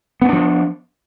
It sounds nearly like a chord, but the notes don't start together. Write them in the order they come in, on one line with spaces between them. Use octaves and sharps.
B3 C#4 D4 F3